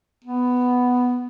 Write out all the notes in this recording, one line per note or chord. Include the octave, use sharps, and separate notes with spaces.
B3